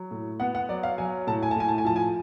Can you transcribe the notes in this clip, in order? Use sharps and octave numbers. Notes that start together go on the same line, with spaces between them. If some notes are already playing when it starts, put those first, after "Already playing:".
Already playing: F#3
A2
B3 F#5
F#5
F#3 D5
F5
F#3 G#5
A2 A5
G#5
A5
A2 G#5
A5
G#5
F3 A5
G#5